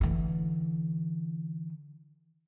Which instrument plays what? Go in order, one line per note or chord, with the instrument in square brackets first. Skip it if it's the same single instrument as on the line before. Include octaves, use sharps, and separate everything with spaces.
[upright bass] D3 E3